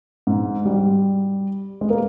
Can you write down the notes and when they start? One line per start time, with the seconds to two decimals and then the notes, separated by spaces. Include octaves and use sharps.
0.27 G#2
0.65 G3
1.81 G#3
1.90 A#3